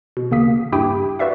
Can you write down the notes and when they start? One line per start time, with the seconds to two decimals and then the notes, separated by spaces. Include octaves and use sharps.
0.17 B2
0.31 D#2 C#3 A#3 D#6 B6
0.72 G2 E4 G4 G5 D#6
1.19 F#4 B4 D5 E5 F5